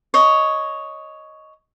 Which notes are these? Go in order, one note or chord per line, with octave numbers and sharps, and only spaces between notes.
C#5 D#5